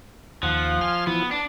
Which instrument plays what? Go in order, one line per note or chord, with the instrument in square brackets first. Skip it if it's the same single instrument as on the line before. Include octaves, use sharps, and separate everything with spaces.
[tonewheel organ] D#2 F#5 [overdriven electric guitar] F3
[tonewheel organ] G#5 C6 F6
[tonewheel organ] E3 F3 [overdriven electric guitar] B3
[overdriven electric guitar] D4 [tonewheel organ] A5